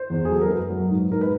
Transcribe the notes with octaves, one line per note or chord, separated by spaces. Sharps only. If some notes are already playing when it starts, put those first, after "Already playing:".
Already playing: C5
E2
G#4
F#3 A4
A#4
F#2 B4
F#3
G#2
G#2 A#4
B4